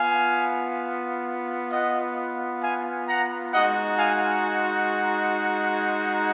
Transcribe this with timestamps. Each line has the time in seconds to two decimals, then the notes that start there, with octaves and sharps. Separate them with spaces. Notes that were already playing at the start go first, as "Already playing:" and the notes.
Already playing: B3 F4 F5 G#5
1.71 D#5 F#5
2.62 F5 G#5
3.07 F#5 A#5
3.52 G#3 D#4 F#4 D#5 F#5
3.98 F5 G#5